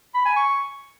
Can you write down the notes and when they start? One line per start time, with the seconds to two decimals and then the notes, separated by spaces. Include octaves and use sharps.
0.15 B5
0.25 G#5
0.36 C#6